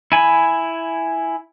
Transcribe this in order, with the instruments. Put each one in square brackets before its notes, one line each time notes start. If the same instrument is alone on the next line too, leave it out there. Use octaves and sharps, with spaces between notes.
[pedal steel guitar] E4 G#5 B5